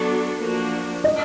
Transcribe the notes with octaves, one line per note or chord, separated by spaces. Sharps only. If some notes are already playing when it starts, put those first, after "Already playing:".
Already playing: F#3 B3 D4 F#4 A4
F3 A#3 D4 F#4
D#5